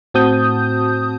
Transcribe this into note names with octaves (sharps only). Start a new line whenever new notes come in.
A2 C4 F#4 A5 D#6 G6